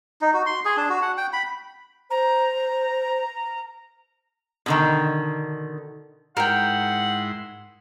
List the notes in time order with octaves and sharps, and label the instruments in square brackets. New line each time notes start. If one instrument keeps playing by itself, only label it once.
[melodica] D#4
F#4
C6
G#4
D4
F#4
F#5
G5
B5
[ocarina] C5 [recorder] A#5
[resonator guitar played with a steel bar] B2 D3 D#3
[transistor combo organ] G#2 E4 C6 [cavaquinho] A#4 G5 [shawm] F#5